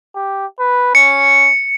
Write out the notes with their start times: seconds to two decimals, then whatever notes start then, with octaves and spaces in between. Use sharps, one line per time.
0.15 G4
0.59 B4
0.95 C#4 C#7